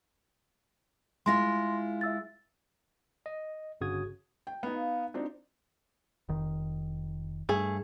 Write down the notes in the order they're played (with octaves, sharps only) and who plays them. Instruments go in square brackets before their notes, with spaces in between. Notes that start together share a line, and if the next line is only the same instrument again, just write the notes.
[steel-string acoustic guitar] G#3 E4 F4 [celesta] C6 A#6
[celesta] E5 E6 A6
[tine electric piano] D#5
G1 G2 C#3 F#4 D#6 G#6
[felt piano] G5
B3 D#4
[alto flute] F5
[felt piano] C4 D4 D#4 [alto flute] F4
[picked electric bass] F1 D#3
[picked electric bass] G2 [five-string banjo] A3 G#4